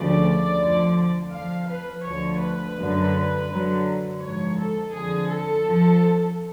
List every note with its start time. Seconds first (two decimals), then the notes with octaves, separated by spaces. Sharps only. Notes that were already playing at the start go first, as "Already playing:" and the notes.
Already playing: D2 C#3 F3 D5
0.60 F2 D3 F3
1.32 F2 F3 F5
1.68 B4
2.04 D2 D3 F3 C#5
2.41 B4
2.77 F#2 D3 F#3
3.49 F#2 D3 F#3
4.21 G#2 F3 C#5
4.58 A4
4.93 F2 D3 F3 G#4
5.29 A4
5.66 F2 F3